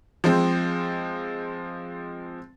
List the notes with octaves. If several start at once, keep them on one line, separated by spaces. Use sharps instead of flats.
F3 G#3 C4